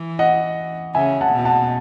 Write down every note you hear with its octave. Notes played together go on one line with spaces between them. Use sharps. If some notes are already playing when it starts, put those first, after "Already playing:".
Already playing: E3
D#5 F#5
C#3 E5 G#5
F#5 A5
B2
F#5 A5